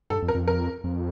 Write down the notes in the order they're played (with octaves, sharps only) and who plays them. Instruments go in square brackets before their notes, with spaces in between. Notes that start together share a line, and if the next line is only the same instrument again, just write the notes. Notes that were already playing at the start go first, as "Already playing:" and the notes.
[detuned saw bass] G2 [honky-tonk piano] A4
[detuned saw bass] F2
[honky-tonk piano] A#4
[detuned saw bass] F2
[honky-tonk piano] A#4
[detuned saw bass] F2